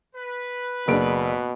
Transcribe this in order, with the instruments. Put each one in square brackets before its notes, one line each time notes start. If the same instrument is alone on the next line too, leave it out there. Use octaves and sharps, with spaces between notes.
[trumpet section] B4
[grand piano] F#1 D7 [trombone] B2 [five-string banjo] D4 G#4 A#4